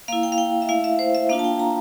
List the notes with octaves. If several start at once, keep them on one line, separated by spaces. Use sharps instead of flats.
A#3 E4 F5
G5
F5
G5
E5
A3 E4 F5
E5
C5
E5
A#3 D4 F4 F5
A5
G5
A#5